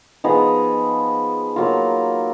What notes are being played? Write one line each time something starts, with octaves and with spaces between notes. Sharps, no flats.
F3 B3 D#4 G#4
F#3 A#3 F4